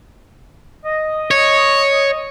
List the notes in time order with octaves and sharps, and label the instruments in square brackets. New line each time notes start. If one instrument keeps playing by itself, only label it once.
[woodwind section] D#5
[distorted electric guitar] C#5